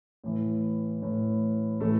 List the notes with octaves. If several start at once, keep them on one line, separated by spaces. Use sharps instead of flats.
A2 E3
A2 E3
A2 E3 A3 A4